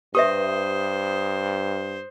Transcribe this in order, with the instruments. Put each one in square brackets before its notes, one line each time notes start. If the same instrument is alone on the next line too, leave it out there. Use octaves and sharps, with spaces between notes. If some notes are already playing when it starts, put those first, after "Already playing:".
[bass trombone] G2 [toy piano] G4 B4 E5 [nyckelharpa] C5 [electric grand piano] D#6